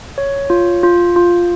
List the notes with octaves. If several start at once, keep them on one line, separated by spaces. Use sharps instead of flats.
C#5
F4
F4
F4